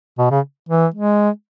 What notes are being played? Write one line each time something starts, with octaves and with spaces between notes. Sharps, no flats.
B2
C#3
E3
G#3